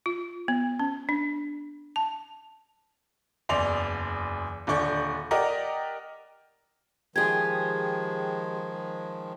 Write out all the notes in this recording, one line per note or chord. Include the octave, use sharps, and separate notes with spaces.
F4
B3
C#4
D4
A5
F#1 E2 D5 C6 F7
D#1 D3 D5 C#6 G6
G4 A#4 D5 D#5 F#5
D#3 F3 G#3 G4 G#4 G#6